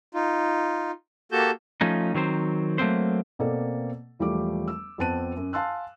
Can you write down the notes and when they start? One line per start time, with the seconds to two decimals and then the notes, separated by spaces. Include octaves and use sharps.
0.14 D#4 F4
1.32 A#3 F#4 G4 A4 A5 G6
1.81 F3 A3 C#4 D#4
2.14 D#3 F#3 C4 C5
2.78 F#3 A3 A#3 C4 C5
3.39 B2 A#3 C4 A4 D5
4.19 E1 F3 G3 A3 D6
4.68 E6
4.98 F2 B3 C4 A5 F#6 D#7
5.36 F#2
5.53 F5 G#5 A5 C6 E6 F#6